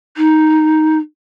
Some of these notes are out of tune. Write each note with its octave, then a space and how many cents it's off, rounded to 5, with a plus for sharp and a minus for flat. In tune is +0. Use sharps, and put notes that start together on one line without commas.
D#4 +5